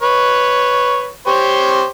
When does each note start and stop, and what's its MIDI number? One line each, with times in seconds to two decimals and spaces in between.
0.02 1.10 71
0.02 1.10 73
1.27 1.86 67
1.27 1.86 72
1.27 1.86 73